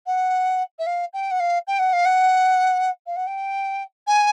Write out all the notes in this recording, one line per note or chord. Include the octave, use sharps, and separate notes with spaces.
F#5
E5
F5
G5
F#5
F5
G5
F#5
F5
F#5
F5
F#5
G5
G#5